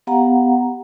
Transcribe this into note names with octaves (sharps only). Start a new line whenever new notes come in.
B3 G4 F5 F#5 A#5